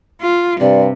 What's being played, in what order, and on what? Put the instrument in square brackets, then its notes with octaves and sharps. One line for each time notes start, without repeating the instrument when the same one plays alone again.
[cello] F4
[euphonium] G2 [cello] C3 [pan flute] D5